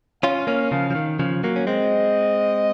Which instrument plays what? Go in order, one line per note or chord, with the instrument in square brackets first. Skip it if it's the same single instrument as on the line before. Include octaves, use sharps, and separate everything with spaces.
[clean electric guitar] C#4 F4 [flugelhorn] F5
[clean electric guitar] A#3 C#4
C#3 F3
F3
D#3
C#3 F3
F#3 A#3
C#4
[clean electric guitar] G#3 C4 [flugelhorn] D#5